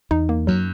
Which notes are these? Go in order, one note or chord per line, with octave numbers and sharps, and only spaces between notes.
E2 D#4
A#3
F#2 F#3